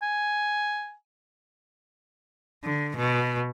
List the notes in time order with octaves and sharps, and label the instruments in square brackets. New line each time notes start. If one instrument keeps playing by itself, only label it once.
[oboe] G#5
[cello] D3
B2